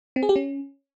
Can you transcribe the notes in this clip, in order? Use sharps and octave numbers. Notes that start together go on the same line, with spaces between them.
C4
G#4
G4
C#4